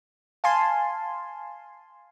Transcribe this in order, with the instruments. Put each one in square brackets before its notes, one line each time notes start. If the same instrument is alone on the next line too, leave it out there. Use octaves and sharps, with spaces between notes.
[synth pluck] F5 G#5 A5 C6